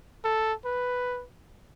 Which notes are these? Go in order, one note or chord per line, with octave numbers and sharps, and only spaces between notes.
A4
B4